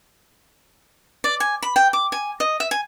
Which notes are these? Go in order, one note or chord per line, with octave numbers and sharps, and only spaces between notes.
D5
G#5
B5
G5
D6
G#5
D#5
E5
G#5